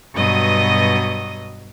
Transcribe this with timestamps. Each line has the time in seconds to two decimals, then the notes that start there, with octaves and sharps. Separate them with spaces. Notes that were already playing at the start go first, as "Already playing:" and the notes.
0.14 G2 B2 F#3 D#5 D#6